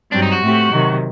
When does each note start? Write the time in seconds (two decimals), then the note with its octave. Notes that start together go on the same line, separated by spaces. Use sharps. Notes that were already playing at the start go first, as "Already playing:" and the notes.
0.12 G2 F#3 C4 D4 G4
0.22 D#4
0.32 F#4
0.42 A2 A3 C4 G4
0.71 C3 D#3 F#3